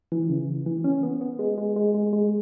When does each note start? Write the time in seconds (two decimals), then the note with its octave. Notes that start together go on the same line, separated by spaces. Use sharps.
0.12 E3
0.29 C#3
0.66 E3
0.84 C#4
1.03 B3
1.21 B3
1.39 G#3
1.58 G#3
1.76 G#3
1.94 G#3
2.13 G#3